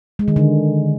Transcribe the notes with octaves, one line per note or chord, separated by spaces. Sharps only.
G#3
D#3
D3